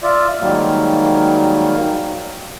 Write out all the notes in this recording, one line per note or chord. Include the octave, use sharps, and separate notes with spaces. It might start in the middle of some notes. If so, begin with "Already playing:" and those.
F4 D5 E5
G#2 D#3 F#3 G3 A#3